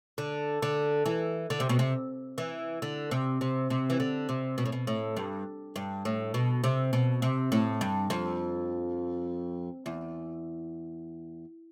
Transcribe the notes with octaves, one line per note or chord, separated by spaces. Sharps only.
D3
D3
E3
D3
C3
B2
C3
E3
D3
C3
C3
C3
E3
D3
C3
B2
A2
B2
A2
G2
G2
A2
B2
C3
B2
C3
A2
G2
F2
E2